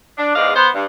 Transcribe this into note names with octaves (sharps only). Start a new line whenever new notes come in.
D4
E2 G#2 D5 D#5 F5
B3 C5
G2